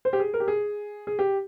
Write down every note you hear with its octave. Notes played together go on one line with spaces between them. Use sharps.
C5
G4
G#4
A#4
G4
G#4
G#4
G4